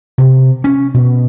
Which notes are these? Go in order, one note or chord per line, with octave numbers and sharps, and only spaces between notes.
C3
C#4
B2